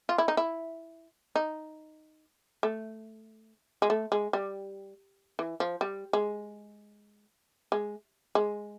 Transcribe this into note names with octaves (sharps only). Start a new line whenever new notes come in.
F4
E4
D#4
E4
D#4
A3
G#3
A3
G#3
G3
E3
F3
G3
G#3
G#3
G#3